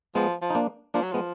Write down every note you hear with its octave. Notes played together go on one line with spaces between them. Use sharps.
F3 G#3 B3
F3
D#4
A#3 D4
F3 A#3 D4
F#3
F3 G#3 B3